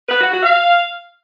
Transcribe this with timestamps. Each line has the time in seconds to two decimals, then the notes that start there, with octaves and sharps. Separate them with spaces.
0.09 B4
0.20 F#4
0.31 F#4
0.43 F5